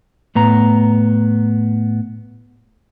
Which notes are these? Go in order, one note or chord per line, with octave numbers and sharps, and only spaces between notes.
A2 B3 A#5